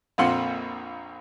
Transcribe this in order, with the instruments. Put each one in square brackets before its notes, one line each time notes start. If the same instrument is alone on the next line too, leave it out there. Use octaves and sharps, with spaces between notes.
[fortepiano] A#1 F2 A#2 F4 F#5 C6